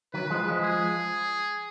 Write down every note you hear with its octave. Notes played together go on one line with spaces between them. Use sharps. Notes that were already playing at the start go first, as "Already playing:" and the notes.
D#3 F#3 B4
F3 G#3
F3 G#3
G#4